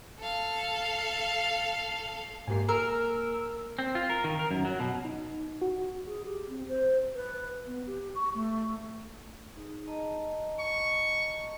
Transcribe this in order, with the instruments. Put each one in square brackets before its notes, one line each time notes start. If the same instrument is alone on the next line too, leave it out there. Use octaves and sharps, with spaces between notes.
[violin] A4 F5
[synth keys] G#2 G4 C7 [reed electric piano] A#3 G#5
[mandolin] A#4 [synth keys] E6
[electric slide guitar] C4
F4
A#4
D#3
A#4
F#2
F#3
B2
[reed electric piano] D#4
F#4
[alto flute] G#4
G4
C4
C5
B4
B3
G4
C#6
A3
[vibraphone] D#4 G#4
D#5 A5 A#5
[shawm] C#6